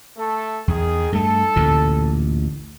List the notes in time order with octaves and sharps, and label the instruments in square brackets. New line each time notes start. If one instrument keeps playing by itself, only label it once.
[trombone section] A3 A4
[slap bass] E2 [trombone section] D#3 G#4
[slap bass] G2 A3 [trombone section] A4
[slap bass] A1 D2 A#2